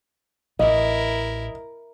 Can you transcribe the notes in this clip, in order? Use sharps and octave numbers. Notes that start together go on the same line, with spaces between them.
A1 E4 A#4 D#5